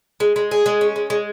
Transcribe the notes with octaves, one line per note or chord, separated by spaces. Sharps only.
G#3
G#3
G#4
G#3
C#4
G#3
G#3